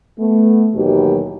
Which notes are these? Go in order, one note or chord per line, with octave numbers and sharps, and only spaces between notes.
A3 B3
D#2 B2 D#3 E3 F#3 G4